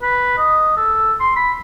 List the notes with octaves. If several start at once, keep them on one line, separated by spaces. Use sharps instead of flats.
B4
D#5
A4
C6
B5